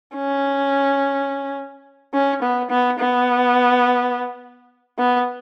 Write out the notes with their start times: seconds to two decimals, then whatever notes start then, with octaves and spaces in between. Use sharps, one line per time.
0.15 C#4
2.13 C#4
2.42 B3
2.70 B3
2.99 B3
4.98 B3